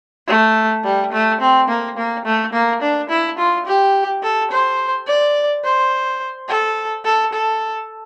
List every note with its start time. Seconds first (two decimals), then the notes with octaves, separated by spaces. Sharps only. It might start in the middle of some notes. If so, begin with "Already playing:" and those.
0.28 A3
0.84 G3
1.13 A3
1.41 C4
1.68 A#3
1.97 A#3
2.25 A3
2.53 A#3
2.81 D4
3.09 E4
3.38 F4
3.66 G4
4.23 A4
4.51 C5
5.07 D5
5.64 C5
6.48 A4
7.05 A4
7.33 A4